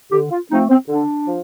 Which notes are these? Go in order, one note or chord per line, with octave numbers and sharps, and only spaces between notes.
D3 G4
F4
F3 A3 C4 D#4
C4
D3 D4
F3